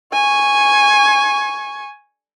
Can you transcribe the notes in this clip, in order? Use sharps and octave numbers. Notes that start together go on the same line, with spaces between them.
G#5 C#6